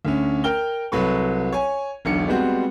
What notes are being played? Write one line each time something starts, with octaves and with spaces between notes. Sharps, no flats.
D2 D3 C#4
A#4 G5 F6 G7
C2 F#3 A4 B4 C#6
C#5 G#5
E1 B1 D3 C#7
G3 G#3 B3 C4 F#4